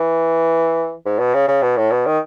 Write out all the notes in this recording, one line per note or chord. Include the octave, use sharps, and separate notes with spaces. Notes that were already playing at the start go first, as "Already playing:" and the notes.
Already playing: E3
G#2
B2
C#3
C#3
B2
A2
B2
D#3